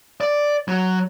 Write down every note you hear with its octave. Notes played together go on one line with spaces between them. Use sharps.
D5
F#3